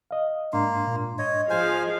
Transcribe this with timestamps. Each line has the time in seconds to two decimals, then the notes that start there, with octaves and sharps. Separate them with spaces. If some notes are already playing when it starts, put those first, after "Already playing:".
0.11 D#5 F5
0.53 G#2 A#3 D4 C6
0.87 A#2
1.19 C#5 D#5
1.50 F3 G#4 C5 F5 G#5